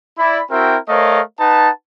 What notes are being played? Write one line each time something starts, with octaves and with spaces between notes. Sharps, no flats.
E4 D5 B5
C4 E4 F#4 A#4 E5 G5
A3 A#4 C5 C#5 D#5 F5
D#4 B4 F#5 A5